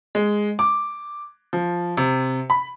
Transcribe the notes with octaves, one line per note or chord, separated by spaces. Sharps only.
G#3
D6
F3
C3
B5